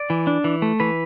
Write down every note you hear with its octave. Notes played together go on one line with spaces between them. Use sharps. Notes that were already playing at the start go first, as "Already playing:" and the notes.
Already playing: D5
E3
D4
E3
A3
E3 B4